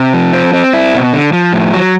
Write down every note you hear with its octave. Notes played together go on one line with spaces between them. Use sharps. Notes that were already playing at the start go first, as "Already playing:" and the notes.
Already playing: C3
F3
C4
C4
E4
B2
D3
F3
A2
F#3